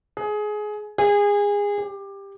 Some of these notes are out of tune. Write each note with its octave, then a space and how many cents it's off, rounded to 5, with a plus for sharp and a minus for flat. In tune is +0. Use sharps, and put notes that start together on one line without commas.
G#4 +20
G#4 -25
G4 +15